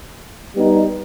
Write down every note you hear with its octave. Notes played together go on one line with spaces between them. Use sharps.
G3 B3 D#4